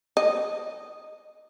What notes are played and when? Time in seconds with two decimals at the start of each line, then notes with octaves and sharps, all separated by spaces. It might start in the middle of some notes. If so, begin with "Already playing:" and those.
0.17 D#5